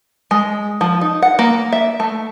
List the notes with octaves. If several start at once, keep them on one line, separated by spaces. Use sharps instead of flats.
G#3
F3
D#4
F#5
A#3
E5
A3